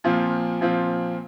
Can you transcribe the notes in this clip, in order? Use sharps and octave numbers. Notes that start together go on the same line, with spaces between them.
A#2 F3 C4 F4
A#2 F3 C4 F4